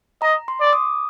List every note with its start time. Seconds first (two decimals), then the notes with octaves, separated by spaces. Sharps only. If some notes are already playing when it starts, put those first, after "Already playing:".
0.22 D#5 A#5
0.48 C6
0.60 D5
0.67 D6
0.73 D#6